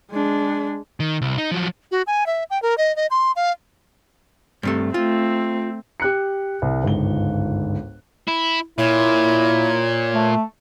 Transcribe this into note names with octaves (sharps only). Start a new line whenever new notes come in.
G#3 D4
D#3
C2
D#4
F3 F#3
F#4
G#5
E5
G5
A#4
D#5
D#5
C6
F5
G2 C3 A3
A3 C4 F4
G4 F#6 C#7
C2
G1 C#2 G#2 G7
E4
A#2 E4 C#5
A3